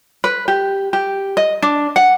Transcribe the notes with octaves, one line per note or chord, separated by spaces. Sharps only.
B4
G4
G4
D#5
D4
F#5